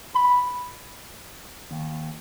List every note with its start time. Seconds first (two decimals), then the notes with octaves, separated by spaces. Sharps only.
0.14 B5
1.71 D#2